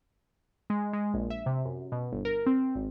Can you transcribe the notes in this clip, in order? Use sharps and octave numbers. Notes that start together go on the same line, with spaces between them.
G#3
G#3
A#1
E5
C3
F#2
B2
G1
A#4
C4
G#1